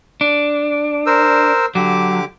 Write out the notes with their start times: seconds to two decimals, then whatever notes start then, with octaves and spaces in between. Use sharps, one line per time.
0.21 D4
1.06 A#4 C5 E6
1.75 D3 F#3 G4 D6